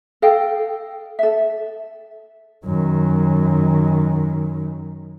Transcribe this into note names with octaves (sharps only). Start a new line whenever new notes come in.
A4 D#5 F5 G5
A4 E5
F#2 D#3